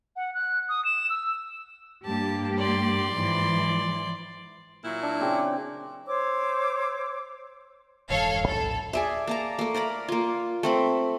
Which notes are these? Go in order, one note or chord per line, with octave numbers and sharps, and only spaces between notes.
F#5
F#6
D#6
E7
E6
G2 A#3 G4 A5
D5 C6
G#2 E3 F3
A#2 F#3 E4
D4
C#3 C4 G4
C5 C#5 D6 E6
E1 G2 D#3 A4 C#5 F5
A#1 D#2 A2 A4
G#4 D5 E5
A#3 A5 A#5
A3 A#3
A#4 D5 A#5 B5
A#3 F4
A3 C4 B5